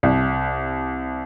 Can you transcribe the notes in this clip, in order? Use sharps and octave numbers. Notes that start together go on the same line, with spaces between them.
C2